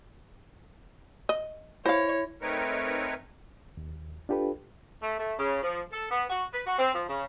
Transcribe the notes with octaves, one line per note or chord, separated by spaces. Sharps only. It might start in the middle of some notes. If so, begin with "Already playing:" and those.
D#5
E4 C5 C#5 F5
A3 C4 D#4 A#4 B4 C#5
D#2
D4 F4 G4 A4 B4
A3
A3
C#3
F3
A4
B3
F#4
B4
F#4
C4
F3
C#3